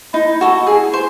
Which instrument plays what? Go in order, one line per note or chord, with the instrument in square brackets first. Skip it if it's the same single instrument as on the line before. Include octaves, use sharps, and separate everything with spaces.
[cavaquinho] D#4 [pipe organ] E4
[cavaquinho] F#4 A4
G#4
C5